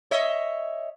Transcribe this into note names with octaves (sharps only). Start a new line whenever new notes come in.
C#5 D#5 E5